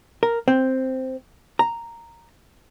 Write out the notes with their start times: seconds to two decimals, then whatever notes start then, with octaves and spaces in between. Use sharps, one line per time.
0.23 A#4
0.48 C4
1.59 A#5